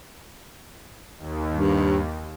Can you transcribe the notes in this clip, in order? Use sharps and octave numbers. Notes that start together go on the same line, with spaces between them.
D#2
G2